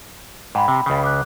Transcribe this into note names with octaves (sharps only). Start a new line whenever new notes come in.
G#2 G5 B5
C3
C#2 C#3
D6 F#6